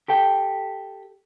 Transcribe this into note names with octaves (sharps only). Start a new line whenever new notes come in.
G4 A4 G5